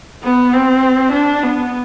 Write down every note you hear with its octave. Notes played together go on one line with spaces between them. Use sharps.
B3
C4
D4
B3